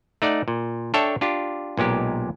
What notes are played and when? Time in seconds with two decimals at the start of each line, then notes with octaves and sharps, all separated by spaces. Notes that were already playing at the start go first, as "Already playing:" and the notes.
0.22 A3 D#4 D5 F#5
0.48 A#2
0.94 D4 A4 C#5 E5 G5
1.21 D4 F4 G4
1.77 B1 A#2 G#3 G4